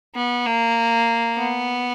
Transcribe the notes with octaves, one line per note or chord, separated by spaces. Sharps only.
B3
A#3
B3